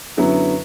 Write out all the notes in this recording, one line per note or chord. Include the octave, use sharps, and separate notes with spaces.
F#2 D3 F#3 B3 E4